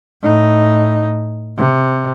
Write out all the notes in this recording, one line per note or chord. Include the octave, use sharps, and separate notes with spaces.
A2 D#4
C3